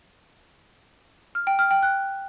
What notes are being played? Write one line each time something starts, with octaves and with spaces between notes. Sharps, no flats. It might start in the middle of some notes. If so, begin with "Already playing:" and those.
F6
G5
F6
G5
F#6